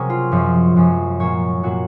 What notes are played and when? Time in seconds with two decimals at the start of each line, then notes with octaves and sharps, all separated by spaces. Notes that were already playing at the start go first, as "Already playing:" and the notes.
Already playing: C3 F#3 C#4 G#4 A#4
0.10 F4
0.32 F#2 F3 G#3 C#4
0.76 F#2 F3 G#3 C#4
1.20 A#2 F#3 A#3 C#5
1.63 A#2 F#3 A#3 F#4